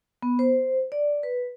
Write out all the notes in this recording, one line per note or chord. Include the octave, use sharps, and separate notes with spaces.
B3
C5
D5
B4